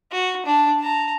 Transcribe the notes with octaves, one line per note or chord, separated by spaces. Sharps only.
F#4
D4
A5 A#5